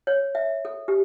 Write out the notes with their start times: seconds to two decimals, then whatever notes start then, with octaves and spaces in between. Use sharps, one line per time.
0.07 C#5
0.35 E5
0.65 A4
0.88 G4